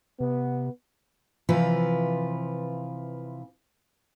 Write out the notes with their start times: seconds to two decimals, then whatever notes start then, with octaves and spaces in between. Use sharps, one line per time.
0.21 C3 B3
1.49 C3 E3 F3 F4 B4